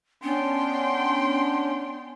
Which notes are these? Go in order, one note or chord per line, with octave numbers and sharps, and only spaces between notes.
B3 C#4 D4 G5 C6